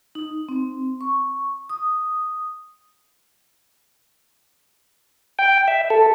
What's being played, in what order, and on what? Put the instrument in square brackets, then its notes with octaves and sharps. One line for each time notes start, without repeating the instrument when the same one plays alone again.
[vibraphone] D#4
C4
C#6
D#6
[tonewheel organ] G5
E5
A4